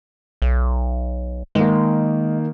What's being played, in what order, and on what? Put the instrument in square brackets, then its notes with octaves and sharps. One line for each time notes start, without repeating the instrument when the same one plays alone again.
[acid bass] B1
[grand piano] D#3 A#3 [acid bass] G#3